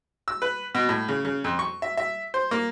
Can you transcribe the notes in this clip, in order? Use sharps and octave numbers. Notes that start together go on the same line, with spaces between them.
E6
B4
B2
A2
C#3
C#3
F2
C#6
E5
E5
C5
A#3